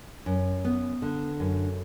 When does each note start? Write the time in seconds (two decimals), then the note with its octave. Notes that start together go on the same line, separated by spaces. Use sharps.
0.26 F#2
0.65 B3
1.02 D3
1.40 F#2